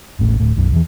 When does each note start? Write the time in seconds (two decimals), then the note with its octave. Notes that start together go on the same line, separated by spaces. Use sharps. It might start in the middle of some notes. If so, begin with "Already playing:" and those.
0.19 D#1 A1 A2
0.40 D1 A2
0.56 B1 F#2
0.72 E2 E3